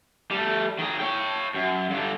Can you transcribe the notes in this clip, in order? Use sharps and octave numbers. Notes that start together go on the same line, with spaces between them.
G3 A3
D#3 G#4
C#5 G5
F#2
G2 D3